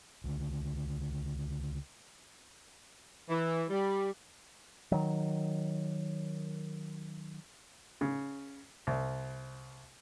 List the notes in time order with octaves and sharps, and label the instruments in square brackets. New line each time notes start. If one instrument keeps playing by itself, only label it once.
[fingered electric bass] C#2 D3
[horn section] E3
G3
[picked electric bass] D#3 F#3
[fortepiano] C#3
C2